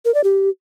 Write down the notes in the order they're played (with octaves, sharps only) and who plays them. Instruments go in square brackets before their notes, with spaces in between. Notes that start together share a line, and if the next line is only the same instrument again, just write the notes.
[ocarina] A#4
D5
G4